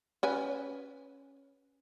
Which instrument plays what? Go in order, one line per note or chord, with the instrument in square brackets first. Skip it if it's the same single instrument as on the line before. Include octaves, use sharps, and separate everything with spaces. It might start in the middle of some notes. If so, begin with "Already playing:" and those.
[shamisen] C#4 B4 G#5